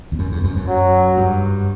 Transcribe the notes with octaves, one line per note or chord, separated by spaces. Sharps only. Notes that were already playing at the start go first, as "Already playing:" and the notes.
E2
F#2
E2
F#2
F#2
F#3
G2